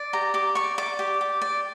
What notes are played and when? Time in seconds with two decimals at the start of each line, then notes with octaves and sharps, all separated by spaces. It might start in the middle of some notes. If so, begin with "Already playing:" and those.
Already playing: D5
0.13 G4 A#5
0.34 G4 D6
0.55 D5 C#6
0.78 D5 D6
0.99 G4
1.21 G4
1.42 D5